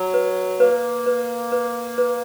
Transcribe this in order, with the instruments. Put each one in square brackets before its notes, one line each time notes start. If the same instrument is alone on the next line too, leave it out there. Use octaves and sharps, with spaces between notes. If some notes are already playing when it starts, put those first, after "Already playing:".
Already playing: [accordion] F#3
[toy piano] B4
[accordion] A#3 [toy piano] B4
[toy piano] B4
B4
B4